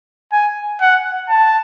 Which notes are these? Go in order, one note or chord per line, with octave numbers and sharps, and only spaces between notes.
G#5
F#5
A5